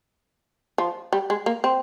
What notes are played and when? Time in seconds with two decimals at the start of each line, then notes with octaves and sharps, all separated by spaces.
0.78 F3
1.13 G3
1.30 G#3
1.46 A#3
1.64 C4